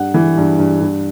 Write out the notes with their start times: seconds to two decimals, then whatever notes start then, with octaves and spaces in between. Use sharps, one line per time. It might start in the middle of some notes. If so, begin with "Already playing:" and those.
Already playing: G2 F#5
0.14 E3
0.37 G2
0.59 G2
0.81 G2